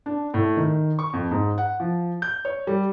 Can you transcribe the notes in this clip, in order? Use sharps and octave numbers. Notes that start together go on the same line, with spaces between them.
D4
A2
D#3
C#6
F2
G#2
F#5
F3
G6
C#5
G3